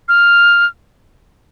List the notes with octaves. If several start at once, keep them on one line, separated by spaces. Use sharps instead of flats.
F6